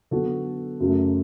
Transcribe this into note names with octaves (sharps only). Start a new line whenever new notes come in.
D3 F#3 B3 F#4 A4
F#2 C#3 F#3 A3